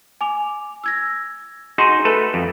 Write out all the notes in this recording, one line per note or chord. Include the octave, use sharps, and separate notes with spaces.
G#5 D6 F7
E6 G#6 A#6
D#4 F#4 G#4 C6 D#7
A3 A4 B4
F2